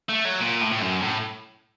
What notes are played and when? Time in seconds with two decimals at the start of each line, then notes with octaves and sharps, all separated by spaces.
0.09 A3
0.25 F#3
0.40 A#2
0.62 A2
0.72 A2
0.82 F#2
1.03 A2